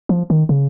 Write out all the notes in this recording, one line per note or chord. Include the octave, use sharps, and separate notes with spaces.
F3
D#3
C#3